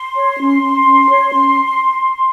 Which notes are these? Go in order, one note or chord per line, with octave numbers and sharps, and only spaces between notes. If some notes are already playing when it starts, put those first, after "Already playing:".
Already playing: C6
C#5
C#4
C#4
C#4
C#5
C#4